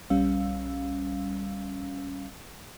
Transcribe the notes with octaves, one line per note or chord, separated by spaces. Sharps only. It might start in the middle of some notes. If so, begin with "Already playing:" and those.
B1 G3 C#4 F5 E6